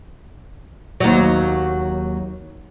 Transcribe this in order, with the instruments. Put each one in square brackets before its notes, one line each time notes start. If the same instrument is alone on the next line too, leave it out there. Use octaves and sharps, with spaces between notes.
[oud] D#2 F#3